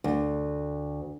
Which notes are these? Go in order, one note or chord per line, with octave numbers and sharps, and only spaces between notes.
D2